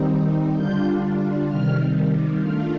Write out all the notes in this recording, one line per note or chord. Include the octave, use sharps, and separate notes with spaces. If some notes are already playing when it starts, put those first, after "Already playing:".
Already playing: D#3 G3 C4 D#4
D3 G3 D4 F4 G6
C3 D#3 G3 F6
D#3 A3 D4 F4 F6